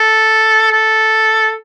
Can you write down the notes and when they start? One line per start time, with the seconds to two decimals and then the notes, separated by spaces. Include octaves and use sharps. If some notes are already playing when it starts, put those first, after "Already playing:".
Already playing: A4
0.72 A4